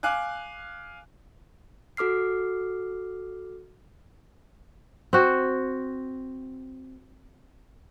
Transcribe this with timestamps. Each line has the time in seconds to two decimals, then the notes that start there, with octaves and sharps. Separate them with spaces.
0.03 F5 G#5 D6 F#6
1.97 F#4 A4 D6 F6 C7
5.13 C4 F#4